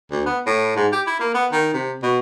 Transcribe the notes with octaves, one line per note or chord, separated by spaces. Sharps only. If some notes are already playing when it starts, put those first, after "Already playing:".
D2
B3
A2
G#2
G4
E4
A#3
B3
D#3
C3
B2